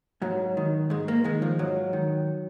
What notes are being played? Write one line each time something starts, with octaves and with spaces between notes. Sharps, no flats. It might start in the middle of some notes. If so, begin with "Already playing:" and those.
G#2 F#3
D#3
G#2 G#3
A#3
D#3 G#3
F3
G#2 F#3
D#3